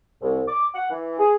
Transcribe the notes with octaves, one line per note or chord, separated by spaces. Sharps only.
C2
D6
F#5
E3
G#4